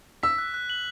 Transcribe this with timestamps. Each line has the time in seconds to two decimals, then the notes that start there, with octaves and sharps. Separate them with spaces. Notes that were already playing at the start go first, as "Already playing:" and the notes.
0.23 E6 B6
0.38 F#6
0.54 F#6
0.70 F#7